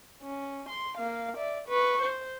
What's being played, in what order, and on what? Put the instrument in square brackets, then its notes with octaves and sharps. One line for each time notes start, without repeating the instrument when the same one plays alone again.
[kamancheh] C#4
C6
A#3 F5
D5 E5
B4 C#6
C5